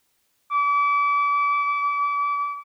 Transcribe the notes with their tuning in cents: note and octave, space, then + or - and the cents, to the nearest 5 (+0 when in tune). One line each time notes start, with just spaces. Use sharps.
D6 -35